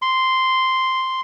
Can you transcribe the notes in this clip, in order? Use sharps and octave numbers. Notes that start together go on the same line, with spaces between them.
C6